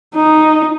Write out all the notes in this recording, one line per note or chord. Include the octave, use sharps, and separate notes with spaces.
D#4